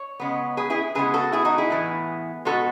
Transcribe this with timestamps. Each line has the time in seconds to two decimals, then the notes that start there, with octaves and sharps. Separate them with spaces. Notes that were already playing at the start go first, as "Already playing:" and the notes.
Already playing: C#5
0.20 C#3 G#3 B3
0.57 G#4 B4
0.70 E4 G#4
0.95 C#3 G#3 B3 G#4 B4
1.14 F#4 A4
1.32 E4 G#4
1.45 D#4 F#4
1.58 E4 G#4
1.70 A2 E3 B3
2.45 B2 G#3 B3 F#4 A4